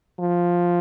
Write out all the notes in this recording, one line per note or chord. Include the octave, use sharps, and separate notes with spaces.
F3